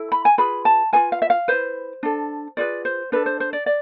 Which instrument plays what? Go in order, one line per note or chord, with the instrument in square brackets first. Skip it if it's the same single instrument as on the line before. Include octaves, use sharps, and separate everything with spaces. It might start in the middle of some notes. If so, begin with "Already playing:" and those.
Already playing: [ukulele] E4 A4
B5
G#5
F4 G#4 B4 B5
A5
F4 G#4 B4 G#5
F5
E5
F5
E4 B4 C5
D4 A4
F4 G#4 B4 D5
C5
D4 A4 B4
C5
C5
D5
D5